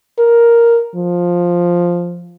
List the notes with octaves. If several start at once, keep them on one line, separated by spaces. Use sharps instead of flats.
A#4
F3